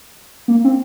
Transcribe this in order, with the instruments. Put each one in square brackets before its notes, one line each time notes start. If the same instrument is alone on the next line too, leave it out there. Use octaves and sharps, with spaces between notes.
[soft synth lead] A#3
C4